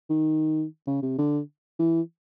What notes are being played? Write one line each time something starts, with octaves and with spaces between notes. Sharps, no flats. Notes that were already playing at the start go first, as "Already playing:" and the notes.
D#3
C#3
C3
D3
E3